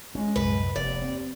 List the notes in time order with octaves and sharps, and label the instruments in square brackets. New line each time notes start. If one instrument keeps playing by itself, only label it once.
[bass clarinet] G#3 [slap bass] C#4
[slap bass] C2 F#2 A2 [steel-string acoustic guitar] B4
[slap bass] F1 C3 [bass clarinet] D#2 [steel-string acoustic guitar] D5
[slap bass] C4